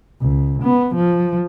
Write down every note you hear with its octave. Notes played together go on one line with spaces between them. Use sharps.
C#2
B3
F3